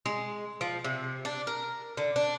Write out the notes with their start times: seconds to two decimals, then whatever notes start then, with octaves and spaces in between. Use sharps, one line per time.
0.06 G#3
0.61 F3
0.84 C3
1.25 D4
1.47 A#4
1.97 D3
2.16 D4